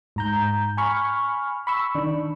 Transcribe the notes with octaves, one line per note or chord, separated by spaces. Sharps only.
G#2 A#5 G6
G#5 B5 C#6 F6
B5 C#6 E6
D#3 D4